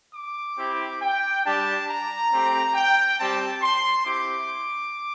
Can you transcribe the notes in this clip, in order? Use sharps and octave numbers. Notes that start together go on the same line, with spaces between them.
D6
C4 E4 G4
G5
G3 D4 G4 A5
A#5
A3 C4 G4
G5
G3 C4 G4 A5
C6
C4 E4 G4 D6